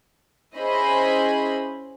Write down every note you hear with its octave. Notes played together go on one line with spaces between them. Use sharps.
C#4 E4 G#4 C5 D#5 B5